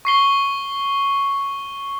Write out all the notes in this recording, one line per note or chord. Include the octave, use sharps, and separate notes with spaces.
C#6 C7 G7